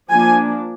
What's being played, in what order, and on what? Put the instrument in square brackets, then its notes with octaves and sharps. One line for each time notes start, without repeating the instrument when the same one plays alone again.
[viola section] F3 A#3 D4 G#5